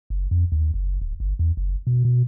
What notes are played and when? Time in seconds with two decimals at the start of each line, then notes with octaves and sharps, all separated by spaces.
0.10 F#1
0.31 F2
0.52 D#2
0.74 F#1
1.01 D1
1.20 G1
1.39 E2
1.57 F#1
1.87 B2
2.05 B2